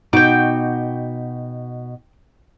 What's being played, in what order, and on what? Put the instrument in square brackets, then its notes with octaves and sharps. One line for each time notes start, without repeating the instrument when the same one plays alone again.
[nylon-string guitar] B2 D#4 F#4 [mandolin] G5 D6